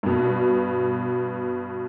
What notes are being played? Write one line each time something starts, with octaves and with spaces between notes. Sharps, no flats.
G2 B2